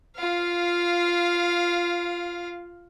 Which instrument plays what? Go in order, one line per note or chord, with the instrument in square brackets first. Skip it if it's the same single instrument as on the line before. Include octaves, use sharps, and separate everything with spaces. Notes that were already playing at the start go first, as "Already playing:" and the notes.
[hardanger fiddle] F4 F5